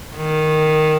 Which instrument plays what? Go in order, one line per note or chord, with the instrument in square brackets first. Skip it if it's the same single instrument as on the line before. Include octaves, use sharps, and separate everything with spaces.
[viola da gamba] D#3